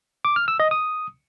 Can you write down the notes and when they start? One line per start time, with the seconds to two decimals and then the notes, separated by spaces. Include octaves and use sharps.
0.25 D6
0.36 F6
0.48 E6
0.60 D#5
0.71 D#6